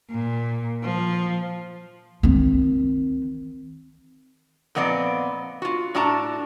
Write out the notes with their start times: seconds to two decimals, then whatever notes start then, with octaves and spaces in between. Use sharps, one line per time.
0.11 A#2
0.84 F3
2.23 D#3 C4
4.75 A#2 F3 B3 C4 D5 D#5
5.62 F4 F#4
5.95 A2 D4 F#4 A5 A#5